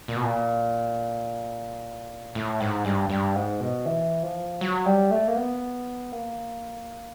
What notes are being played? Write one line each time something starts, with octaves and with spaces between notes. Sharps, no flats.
A#2
B2
A#2
A2
G#2
G2
G2
G#2
B2
E3
F3
F#3
G3
A3
A#3
B3
A#3